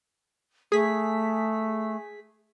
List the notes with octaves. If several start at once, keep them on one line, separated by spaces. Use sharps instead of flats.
A3 G#4 B6